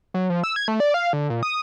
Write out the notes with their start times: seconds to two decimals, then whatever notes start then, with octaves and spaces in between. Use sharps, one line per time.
0.14 F#3
0.30 F3
0.44 E6
0.56 G#6
0.68 A3
0.80 D5
0.94 F5
1.13 D3
1.30 A#2
1.43 D#6